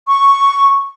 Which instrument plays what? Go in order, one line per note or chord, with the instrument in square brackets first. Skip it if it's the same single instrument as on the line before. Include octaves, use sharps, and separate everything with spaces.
[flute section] C#6